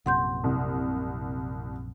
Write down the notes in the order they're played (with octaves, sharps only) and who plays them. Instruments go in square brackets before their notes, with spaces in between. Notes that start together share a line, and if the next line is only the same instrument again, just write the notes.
[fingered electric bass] A#1 F#2 C3 [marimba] F#5 C6 G6
[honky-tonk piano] C2